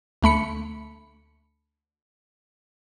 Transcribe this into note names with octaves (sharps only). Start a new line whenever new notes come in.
D2 A3 B5 C#7